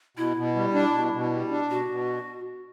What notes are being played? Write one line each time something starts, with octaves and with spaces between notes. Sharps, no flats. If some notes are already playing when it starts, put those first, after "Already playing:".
B2 E4
B2
G3
D4
B2
B2
G3
D4
B2 F#4
B2